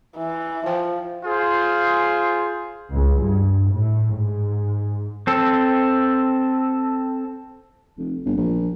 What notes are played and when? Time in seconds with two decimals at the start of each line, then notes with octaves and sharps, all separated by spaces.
0.17 E3
0.66 F3 C5 G5
1.25 F4 G#4 C5
2.90 C#2
3.22 G2
3.71 A2
4.12 G#2
5.27 C4 A4
7.98 F1
8.25 G1
8.37 A#1